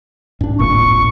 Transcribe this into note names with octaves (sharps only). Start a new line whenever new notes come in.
G2 D4
D1 G1 A#2 C#6